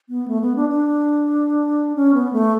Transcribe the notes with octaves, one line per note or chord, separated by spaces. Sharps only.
B3
A3
B3
D4
D4
C#4
B3
A3